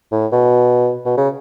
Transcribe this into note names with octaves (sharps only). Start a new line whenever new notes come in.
A2
B2
B2
C#3